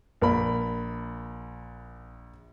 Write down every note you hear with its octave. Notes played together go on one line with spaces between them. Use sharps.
A#1 A#4 B5